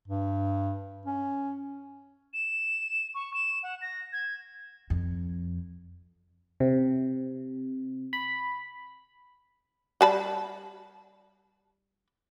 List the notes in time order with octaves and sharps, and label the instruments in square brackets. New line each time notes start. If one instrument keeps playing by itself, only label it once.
[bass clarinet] G2
C#4
[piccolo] E7
C#6
E7
F#5
A#6
G#6
[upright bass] F2
[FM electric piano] C3
B5
[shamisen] G3 A5 B5